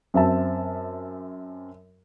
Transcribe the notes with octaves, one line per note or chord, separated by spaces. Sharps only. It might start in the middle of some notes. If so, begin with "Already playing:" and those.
F#2 C4 E5 A5